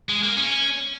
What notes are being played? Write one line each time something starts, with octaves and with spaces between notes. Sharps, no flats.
G#3
A#3
C#4